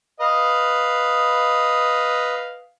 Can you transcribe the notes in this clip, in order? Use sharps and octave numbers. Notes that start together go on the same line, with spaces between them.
B4 D#5 F5